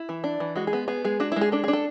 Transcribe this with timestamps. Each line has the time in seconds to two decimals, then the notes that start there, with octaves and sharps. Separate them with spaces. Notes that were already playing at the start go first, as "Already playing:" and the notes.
Already playing: E4
0.09 E3
0.24 D4
0.40 E3
0.56 G#3 F#4
0.67 G#4
0.73 B3
0.88 B3 G#4
1.05 G#3 G#4
1.20 D4 F#4
1.32 G#3 E4
1.41 G#4
1.52 D4 A4
1.64 G#4
1.68 D4
1.73 A4